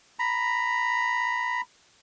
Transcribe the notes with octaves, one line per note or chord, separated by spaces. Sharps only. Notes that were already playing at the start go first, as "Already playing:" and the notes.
A#5 B5